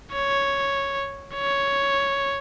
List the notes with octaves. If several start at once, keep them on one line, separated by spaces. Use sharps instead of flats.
C#5
C#5